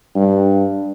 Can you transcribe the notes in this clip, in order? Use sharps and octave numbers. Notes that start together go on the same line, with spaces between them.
G2